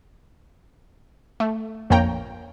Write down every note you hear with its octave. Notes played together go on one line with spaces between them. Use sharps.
A3
A#1 F2 A#3 C#5 G5 A#5